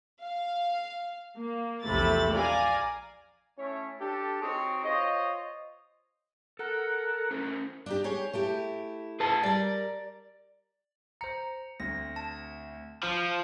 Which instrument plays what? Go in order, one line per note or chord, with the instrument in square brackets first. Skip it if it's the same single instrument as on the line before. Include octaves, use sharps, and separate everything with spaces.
[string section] F5
A#3
A#1 E2 C3 A3 B5 A6
D5 F5 G#5 A#5
[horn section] A3 C#4 E4 C#5
D4 G4 A4
C4 D#4 F#4 G#4 C5 C#5
F4 C5 C#5 D#5
[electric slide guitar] A4 [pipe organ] A#4 F#5
[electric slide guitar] C#4 A#4 C5
[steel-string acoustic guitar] D4 D#4 G4
G4 G#4 C#5
A3 E4 G4
[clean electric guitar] G#4 B4 A5
[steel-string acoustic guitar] G3 A#4 [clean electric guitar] D5
[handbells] C5 A#5 [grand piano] C#7
[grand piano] D2 C4 [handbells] A#6
[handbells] A5
[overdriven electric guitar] F3 [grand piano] F6